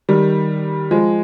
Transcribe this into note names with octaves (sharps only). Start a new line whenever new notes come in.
D#3 G3
F3 G#3